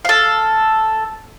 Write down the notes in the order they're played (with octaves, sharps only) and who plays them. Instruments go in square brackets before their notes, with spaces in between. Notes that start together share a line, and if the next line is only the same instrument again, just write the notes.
[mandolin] A4 F5